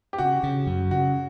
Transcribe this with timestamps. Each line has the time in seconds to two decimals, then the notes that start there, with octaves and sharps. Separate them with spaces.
0.13 G4
0.18 C#3 F#4
0.43 C#3
0.67 F#2
0.91 C#3 F#4